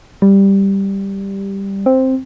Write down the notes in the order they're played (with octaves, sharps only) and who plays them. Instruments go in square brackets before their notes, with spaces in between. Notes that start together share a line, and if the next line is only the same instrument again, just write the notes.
[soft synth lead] G3
C4